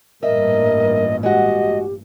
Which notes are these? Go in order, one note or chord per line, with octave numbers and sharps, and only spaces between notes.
A1 G2 A#2 A#4 D#5 E5
G#3 F#4 G4 D#5